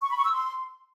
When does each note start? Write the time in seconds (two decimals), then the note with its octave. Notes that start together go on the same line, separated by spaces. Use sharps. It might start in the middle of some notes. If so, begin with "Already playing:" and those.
0.03 C#6
0.10 B5
0.17 C#6
0.24 E6
0.32 C6